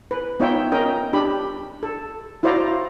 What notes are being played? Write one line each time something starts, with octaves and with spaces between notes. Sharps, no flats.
B4
B3 D#4 F4 C#5 E5 G5
C#4 A#4 D#5 G5
D4 G4 B5
A4
E4 F#4 C5 D5 F5 A#5